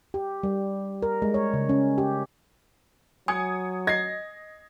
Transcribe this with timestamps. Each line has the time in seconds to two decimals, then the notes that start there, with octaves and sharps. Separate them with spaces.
0.14 G4
0.43 G3
1.02 A#4
1.22 G#3
1.34 C#5
1.54 C#3
1.69 C#4
1.98 G4
3.28 F#3 G#5 D#6 G#6 C#7
3.87 D#5 G#6 A#6 C7